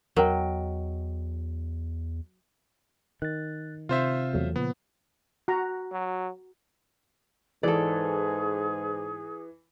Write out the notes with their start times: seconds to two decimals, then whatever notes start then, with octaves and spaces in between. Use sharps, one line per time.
0.16 E2 F#3 A#4 D#5 G5
3.22 D#3 F#6 A6
3.89 C3 C4 F4 C5 E5
4.34 E2 F#3 A3
4.56 A#2 C#3 F3 B3
5.48 F#4 A#5
5.92 F#3
7.63 G#2 E3 G#4 A4 D5